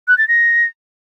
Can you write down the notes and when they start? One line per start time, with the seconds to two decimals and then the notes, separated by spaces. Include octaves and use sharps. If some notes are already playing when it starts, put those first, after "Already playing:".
0.08 F#6
0.18 A6
0.28 A#6